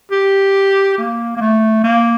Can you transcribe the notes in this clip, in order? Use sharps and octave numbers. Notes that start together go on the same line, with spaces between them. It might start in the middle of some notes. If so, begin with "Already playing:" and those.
G4
A#3
A#3
A3
A#3